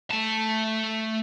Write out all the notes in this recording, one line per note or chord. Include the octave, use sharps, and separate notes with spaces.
A3 A5